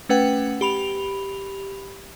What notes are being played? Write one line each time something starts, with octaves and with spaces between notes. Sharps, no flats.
A3 C#4 B4 F#5 G5
G4 B5 F7